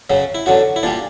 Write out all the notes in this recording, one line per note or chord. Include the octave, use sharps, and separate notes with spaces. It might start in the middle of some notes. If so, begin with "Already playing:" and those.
F#2 C#3 F#3
E4
F#2 D3 F#3 F#4
E4
A#2 G3 D4